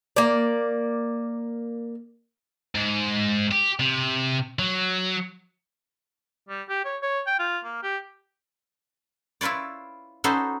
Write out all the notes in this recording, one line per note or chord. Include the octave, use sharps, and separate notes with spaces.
A#3 D5
G#2
G4
C3
F#3
G3
G4
C#5
C#5
G5
F4
A#3
G4
E4 F4 B4 C#5 D5
C#4 D#4 F#4 A4 B4 C5